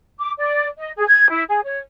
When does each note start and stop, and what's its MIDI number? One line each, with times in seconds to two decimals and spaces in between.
0.20 0.32 86
0.38 0.67 74
0.77 0.91 75
0.96 1.04 68
1.08 1.28 92
1.30 1.43 64
1.48 1.60 68
1.64 1.79 73